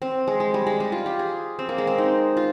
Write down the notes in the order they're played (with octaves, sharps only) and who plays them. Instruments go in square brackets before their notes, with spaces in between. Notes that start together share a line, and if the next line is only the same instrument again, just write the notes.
[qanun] C4
G#3
G#3
G3
G#3
G3
F4
G4
G#4
C4
A#3
G#3
C4
D#4
F4